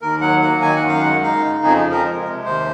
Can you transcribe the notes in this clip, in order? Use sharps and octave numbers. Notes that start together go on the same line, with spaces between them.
D#2 A#4
F#3 F#5
A#3 F#5
D#3 G#5
F#5
F#2
F5
G#3 F#5
D#4 F5
C#3
F2 G#4
G#4
F3
A#4
G#3
C3
D#2 C5